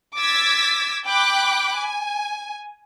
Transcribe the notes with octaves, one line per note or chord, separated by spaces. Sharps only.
D6 E6 G#6 A6 B6
G5 B5 D6 F#6
G#5